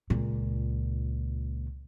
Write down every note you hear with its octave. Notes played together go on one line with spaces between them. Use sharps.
C#2 A#2